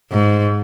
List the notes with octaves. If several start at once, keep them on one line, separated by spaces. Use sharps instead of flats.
G#2